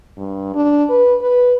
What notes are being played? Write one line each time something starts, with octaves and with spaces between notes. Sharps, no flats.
G2
D4
B4
B4